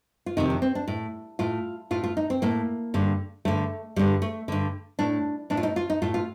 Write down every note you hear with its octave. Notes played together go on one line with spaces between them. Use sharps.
F4
F2 C3 D#3 D#4
D4
C4
D4
A2
A2 F4
A2 F4
F4
D#4
C4
A2 A#3
G2 D3
G2 D3 A3
G2 D3 G3
A3
G2 D3
A2 D4
A2 D4
F4
D#4
F4
D#4
A2 F4
F4